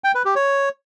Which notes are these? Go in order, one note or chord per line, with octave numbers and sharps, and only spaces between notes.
G5
B4
G4
C#5